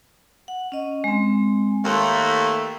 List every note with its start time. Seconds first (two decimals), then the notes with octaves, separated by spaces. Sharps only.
0.48 F#5
0.72 C#4 D#5
1.04 G#3 C4
1.85 D#2 A3 C6